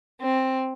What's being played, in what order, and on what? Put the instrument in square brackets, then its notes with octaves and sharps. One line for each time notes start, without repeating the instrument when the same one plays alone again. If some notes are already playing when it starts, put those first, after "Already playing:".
[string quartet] C4